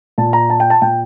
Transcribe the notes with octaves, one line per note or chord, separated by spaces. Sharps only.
A#2 A5
A#5
A5
G5
A5
A#2 G5